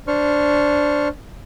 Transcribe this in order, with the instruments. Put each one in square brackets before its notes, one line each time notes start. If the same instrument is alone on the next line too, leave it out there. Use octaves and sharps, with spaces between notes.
[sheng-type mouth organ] D4 C5 C#6 F6